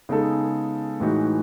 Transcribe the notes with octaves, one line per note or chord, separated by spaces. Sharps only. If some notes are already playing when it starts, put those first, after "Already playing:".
C#3 G#3 B3 D#4 A4
A2 E3 G#3 D#4 F#4